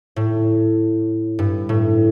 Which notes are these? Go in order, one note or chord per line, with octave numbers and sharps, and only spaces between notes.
A2
G2
A2